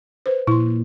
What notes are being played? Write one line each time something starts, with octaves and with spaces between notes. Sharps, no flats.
B4 C5
A#2 E4 C6